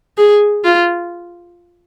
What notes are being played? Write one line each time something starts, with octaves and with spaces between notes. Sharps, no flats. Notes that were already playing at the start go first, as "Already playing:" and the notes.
G#4
F4